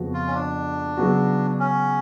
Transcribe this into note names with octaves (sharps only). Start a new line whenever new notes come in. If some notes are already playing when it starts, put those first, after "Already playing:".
Already playing: F2 C#3 F3 B3 F#4
F4
C#4
D4
C#3 F#3 B3 F#4
C#4